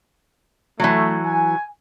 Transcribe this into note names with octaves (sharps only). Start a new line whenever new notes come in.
E3 F#3 A3
G#5